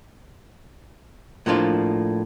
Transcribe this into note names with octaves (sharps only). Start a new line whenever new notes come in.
A2 F3 A#3 D4 F4